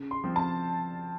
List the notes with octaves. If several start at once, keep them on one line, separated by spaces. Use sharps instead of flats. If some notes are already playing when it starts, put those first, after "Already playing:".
Already playing: C#3
C6
F3 C4
A5